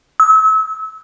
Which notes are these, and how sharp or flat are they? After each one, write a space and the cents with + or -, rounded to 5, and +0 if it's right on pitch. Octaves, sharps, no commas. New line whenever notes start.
E6 -35